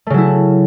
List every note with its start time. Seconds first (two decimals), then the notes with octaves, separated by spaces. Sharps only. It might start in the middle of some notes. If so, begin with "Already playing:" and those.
0.07 A3
0.10 C#3
0.14 F#3
0.18 E4